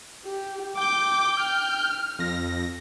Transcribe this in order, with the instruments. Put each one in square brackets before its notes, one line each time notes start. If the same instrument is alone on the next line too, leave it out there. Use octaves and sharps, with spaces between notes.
[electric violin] G4
[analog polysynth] G5 G6 [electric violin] D6
[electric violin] F6
[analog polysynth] F2 A#6